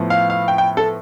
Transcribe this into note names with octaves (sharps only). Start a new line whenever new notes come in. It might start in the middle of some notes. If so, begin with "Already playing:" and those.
Already playing: A2 F3 B3
F5
F5
G5
G5
A4